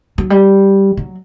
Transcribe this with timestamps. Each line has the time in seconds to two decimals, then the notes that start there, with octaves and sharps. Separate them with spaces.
0.18 F#3
0.30 G3
0.97 F#3